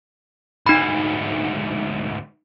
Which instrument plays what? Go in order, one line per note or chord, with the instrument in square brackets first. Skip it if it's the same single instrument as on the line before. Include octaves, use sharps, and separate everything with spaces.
[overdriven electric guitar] D2 G#2 [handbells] D#4 B5